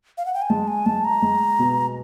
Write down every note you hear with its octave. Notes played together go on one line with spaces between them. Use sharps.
F5
F#5
G5
G#5
G#3 A5
G#5
G#3 A5
A#5
G#3
B2